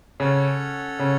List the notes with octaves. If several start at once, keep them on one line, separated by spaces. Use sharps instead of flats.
C#3 C#4 A4 C#5 F#5
C#3